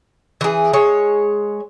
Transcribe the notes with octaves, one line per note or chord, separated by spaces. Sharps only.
E3 G#4
G#3 C#5